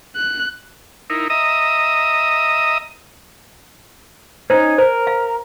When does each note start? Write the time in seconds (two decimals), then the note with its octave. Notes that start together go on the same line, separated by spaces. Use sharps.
0.16 F#6
1.10 D#4 E4 A#4
1.30 D#5 E5 A#5 D#6
4.50 C#4 D#4 C5
4.78 A#4 C5
5.07 F5